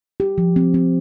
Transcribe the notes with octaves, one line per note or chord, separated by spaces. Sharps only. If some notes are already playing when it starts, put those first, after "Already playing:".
G4
F3
C4
C4